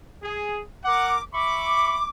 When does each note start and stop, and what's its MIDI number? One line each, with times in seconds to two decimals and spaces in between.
0.23 0.62 68
0.85 1.17 70
0.85 1.17 78
0.85 1.22 86
1.33 2.02 76
1.33 2.02 83
1.33 2.02 85
1.33 2.08 86